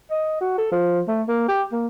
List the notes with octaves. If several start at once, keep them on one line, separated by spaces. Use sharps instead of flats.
D#5
F#4
A4
F3
A3
A#3
G4
A#3